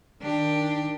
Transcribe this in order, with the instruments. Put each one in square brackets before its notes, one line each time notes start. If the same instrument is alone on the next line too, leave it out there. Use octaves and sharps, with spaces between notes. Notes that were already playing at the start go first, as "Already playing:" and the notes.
[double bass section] D#3 [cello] D4 G4